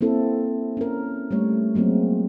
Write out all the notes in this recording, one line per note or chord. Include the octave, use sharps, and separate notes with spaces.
A#3 C4 E4 A4
C#4 A#4
G3 A3 C#5
F#3 G#3 A#3 C4